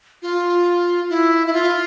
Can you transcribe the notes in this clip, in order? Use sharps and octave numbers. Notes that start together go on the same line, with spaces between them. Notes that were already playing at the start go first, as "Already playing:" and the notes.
F4
E4
E4
F4